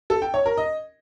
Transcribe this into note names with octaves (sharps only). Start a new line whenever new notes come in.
A4
G5
C#5
A#4
D#5